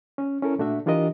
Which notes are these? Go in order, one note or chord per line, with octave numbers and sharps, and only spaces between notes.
C#4
C#4 E4 A4 A#4
A#2 A3 D4 F#4 E5
E3 D4 F4 G4 A#4 D#5